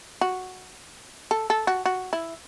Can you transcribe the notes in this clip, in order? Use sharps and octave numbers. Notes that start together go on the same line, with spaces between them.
F#4
A4
A4
F#4
F#4
E4